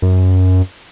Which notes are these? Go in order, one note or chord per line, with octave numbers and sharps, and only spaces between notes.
F#2